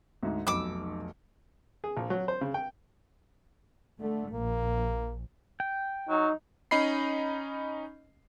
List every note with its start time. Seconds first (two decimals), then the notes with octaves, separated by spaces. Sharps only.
0.23 D2 G#2
0.47 F1 B1 D6 E6
1.84 G#4
1.97 A#1
2.10 F#3
2.28 C5
2.41 C#3
2.54 G5
4.00 D3 A3
4.32 A#1 A#3
5.60 G5
6.09 F#3 D#4
6.71 C#4 D#4 D#5 B5 C7